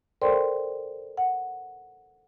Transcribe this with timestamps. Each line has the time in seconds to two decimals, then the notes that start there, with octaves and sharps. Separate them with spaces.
0.22 A4 A#4 C5 D5 G5 C6
1.17 F#5